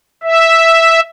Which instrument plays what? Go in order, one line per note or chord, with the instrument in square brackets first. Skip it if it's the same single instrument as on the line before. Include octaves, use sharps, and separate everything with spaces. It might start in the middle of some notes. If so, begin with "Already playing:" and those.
[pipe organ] E5